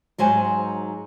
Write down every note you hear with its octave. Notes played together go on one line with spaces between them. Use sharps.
G#2 F#3 C5 G#5